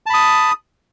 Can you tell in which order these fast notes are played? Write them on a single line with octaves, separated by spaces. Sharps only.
A5 B5 D#6